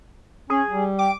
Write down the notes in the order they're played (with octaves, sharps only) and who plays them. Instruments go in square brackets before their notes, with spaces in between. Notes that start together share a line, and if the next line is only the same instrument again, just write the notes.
[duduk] C#4 [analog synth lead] G#4
[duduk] G3
[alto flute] G5 [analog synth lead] D6